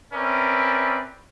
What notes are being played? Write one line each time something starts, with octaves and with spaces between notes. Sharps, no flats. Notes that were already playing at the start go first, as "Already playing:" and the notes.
C4 C#4 A#4 B4 D5 E5